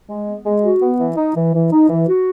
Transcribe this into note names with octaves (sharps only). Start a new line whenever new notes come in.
G#3
B3
G#3
F#4
B3
E3
D#4
E3
E3
D#4
E3
F#4